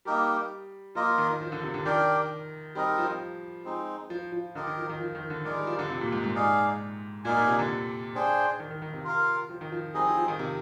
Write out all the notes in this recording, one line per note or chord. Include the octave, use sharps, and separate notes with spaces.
G3 A#3 D#4 G4 A#4
F3 A#3 F4 A#4 D#5
D#3
F3
D3
C3
D3
D#3 D4 G4 A#4 D5 G5
G3 C4 D#4 A#4 D#5
F3
G#3 C4 D#4
F3
F3
D3 G4 A#4 D#5
D#3
F3
D#3
F3
D#3
D3
D#3 G#3 D#4 A#4 D5
G3
F3
D3
C3
A#2
G#2
G#2
D#4 G#4 D5 F5
A#2 D#4 A#4 D5 F5 G#5
A#2
C3
D3
D4 G#4 C5 G5
D#3
D#3
D#3
C3
F4 A#4 F5
F3
D#3
F3
G3 C4 D#4 G#4 D#5
F3
F3
D#3
C3